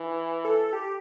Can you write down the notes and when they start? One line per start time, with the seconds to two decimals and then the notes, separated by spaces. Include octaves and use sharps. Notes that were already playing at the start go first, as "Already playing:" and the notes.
Already playing: E3
0.45 A4
0.73 G4